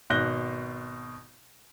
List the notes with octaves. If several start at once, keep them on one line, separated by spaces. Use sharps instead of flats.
G#1 B2 F#6 G6 A#6 G7